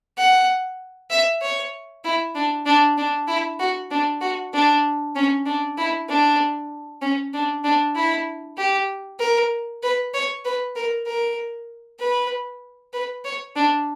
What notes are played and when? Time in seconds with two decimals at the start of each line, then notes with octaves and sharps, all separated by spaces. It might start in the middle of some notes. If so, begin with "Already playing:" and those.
0.17 F#5
1.10 E5
1.42 C#5
2.04 E4
2.35 D4
2.66 D4
2.98 D4
3.28 E4
3.59 F#4
3.91 D4
4.21 F#4
4.53 D4
5.15 C#4
5.46 D4
5.78 E4
6.09 D4
7.02 C#4
7.34 D4
7.64 D4
7.95 E4
8.57 G4
9.20 A#4
9.83 B4
10.14 C#5
10.45 B4
10.76 A#4
11.07 A#4
12.00 B4
12.93 B4
13.25 C#5
13.56 D4